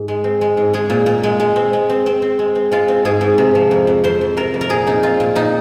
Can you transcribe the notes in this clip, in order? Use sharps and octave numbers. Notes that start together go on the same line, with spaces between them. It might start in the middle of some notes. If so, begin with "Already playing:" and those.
Already playing: G#2
G#3
C4
G#3
G#2
G#3 G#4
A#2
A#2
G#3
G#3
C4
G#3
C4
C4
C4
G#3
C4
G#3 F4
C4
G#2 G#4
G#2
C3
F3
F2
F2
F2 C5
F2
C3 A#4
F2
A#4
A#2 G#4
A#2 D#4
C4 F4
A#2
A#2 D#4